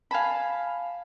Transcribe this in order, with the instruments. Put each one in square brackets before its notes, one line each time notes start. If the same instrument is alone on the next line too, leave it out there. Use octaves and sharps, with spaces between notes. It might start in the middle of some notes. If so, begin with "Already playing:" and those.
[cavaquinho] F5 G#5 A5 B5